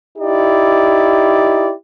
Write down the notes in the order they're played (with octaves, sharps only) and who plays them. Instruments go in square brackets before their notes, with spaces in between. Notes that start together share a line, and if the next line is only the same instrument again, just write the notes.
[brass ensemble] D#4 E4 G4 D5